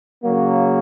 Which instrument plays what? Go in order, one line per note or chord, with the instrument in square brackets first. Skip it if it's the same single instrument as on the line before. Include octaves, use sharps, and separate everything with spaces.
[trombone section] C#3 F#3 A#3